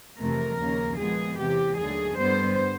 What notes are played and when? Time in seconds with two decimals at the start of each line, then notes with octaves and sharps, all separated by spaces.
0.18 F2 C3 E3 A3 A#4
0.59 D#2 C#3 F3 A#3 C#4
0.98 A#2 F3 G#3 B3 G#4
1.38 E2 C3 E3 G4
1.77 D#2 D3 F#3 A3 G#4
2.18 G2 D3 G3 B3 C5